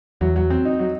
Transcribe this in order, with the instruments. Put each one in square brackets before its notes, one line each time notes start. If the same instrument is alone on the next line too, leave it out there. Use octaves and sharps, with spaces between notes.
[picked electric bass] E2 [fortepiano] F#3
[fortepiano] F#3
C4
D#4
F#3